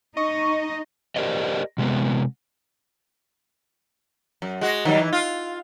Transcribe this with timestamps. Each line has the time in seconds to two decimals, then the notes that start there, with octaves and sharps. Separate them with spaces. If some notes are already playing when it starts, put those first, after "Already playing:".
0.17 D#4 D#5 C#6
1.16 G4 A#4 C5 D5 D#5
1.78 C3 G#3 B3
4.42 F#2
4.61 G#3 F#4
4.85 D#3 F#3 G3
4.99 E3
5.13 F4